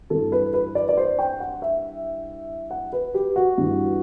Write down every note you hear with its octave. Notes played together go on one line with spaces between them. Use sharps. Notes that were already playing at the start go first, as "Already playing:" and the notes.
G2 E3 A4
B4
B4
D5
D5
C5
G5
F#5
E5
F#5
B4
G4
F#4
G2 E3